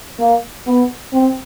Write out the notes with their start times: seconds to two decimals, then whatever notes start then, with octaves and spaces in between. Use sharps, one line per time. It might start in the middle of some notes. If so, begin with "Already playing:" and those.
0.19 A#3
0.67 B3
1.13 C4